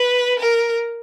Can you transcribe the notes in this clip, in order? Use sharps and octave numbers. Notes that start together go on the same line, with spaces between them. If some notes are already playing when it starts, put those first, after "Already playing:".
Already playing: B4
A#4